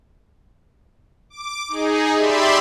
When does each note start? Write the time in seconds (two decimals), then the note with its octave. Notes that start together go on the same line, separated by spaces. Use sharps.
1.30 D6
1.69 D#4 G#4
2.15 G4 D5 E5 B5 C6